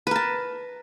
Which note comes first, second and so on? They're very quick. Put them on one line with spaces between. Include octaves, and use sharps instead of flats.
B4 A#4 A5